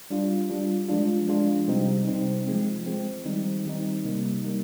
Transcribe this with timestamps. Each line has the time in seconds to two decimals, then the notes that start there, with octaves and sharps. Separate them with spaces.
0.10 G3 D4 F4
0.50 G3 D4 F4
0.88 F3 G#3 D4 F4
1.28 F3 G#3 D4 F4
1.68 C3 G3 C4 D#4
2.07 C3 G3 C4 D#4
2.47 F3 G#3 C4
2.86 F3 G#3 C4
3.26 D#3 G3 C4 D#4
3.65 D#3 G3 C4 D#4
4.05 C3 G3 A#3 D#4
4.44 C3 G3 A#3 D#4